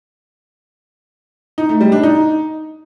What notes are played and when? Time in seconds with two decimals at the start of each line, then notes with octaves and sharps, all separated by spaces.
1.58 D#4
1.69 A3
1.81 G3
1.92 D4
2.03 D#4